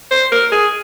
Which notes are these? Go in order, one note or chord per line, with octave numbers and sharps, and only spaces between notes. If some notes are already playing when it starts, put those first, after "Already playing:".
C5
A#4
G#4